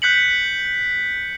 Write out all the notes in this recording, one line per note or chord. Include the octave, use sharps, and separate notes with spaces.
F#6 G6 B6 C#7 F#7